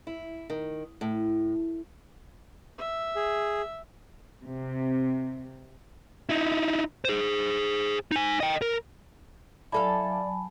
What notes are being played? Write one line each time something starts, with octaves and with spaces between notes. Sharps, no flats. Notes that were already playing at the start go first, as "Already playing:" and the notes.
E4
D#3
A2
E5
G#4
C3
D#4 E4
G#4 C5
D#4 G#5
D#5 G5
A#4
F#3 E4 A4 D5 F5 G#5 A5 B5